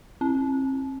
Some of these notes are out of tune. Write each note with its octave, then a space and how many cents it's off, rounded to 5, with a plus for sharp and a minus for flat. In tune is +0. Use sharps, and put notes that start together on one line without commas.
C4 +40